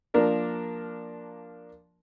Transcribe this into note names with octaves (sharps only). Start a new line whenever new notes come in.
F3 A#3 D4 A#4 D5